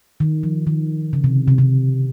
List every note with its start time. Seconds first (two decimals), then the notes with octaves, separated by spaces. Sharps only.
0.20 D#3
0.43 F3
0.67 D#3
1.13 C#3
1.24 C3
1.48 C3
1.58 C3